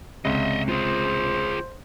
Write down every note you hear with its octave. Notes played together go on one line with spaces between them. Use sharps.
C#2 C3 D#5 E5
F4 G#4 C5